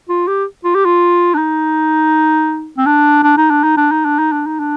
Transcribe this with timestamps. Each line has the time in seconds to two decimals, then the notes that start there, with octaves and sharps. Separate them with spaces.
0.09 F4
0.28 G4
0.64 F4
0.75 G4
0.85 F4
1.34 D4
1.38 D#4
2.78 C4
2.86 D4
3.23 D4
3.37 D#4
3.50 D4
3.64 D#4
3.77 D4
3.92 D#4
4.05 D4
4.19 D#4
4.32 D4
4.47 D#4
4.60 D4